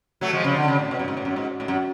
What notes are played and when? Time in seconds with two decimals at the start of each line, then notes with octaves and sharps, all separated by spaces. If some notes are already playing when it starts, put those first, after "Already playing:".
0.21 F#3 A3
0.33 F3 G#3
0.44 C#3 F3
0.56 D3
0.68 C#3
0.79 A2
0.91 B2
0.99 F#2
1.08 G#2
1.17 A2
1.25 F#2
1.36 G#2
1.60 A2
1.68 F#2